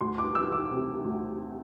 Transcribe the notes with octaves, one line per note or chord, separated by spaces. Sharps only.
D2 C6
D6
E3 E6
D6
C3
D2